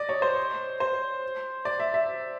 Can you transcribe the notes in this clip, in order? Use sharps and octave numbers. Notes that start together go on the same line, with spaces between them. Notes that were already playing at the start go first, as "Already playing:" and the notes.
Already playing: D5 D#5
C#5
C5
C5
D5
E5
E5